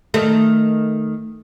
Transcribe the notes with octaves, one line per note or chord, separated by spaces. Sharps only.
D#3 A3